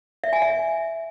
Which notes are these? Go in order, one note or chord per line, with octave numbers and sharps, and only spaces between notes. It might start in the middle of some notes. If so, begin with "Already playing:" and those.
E5
G#5
E5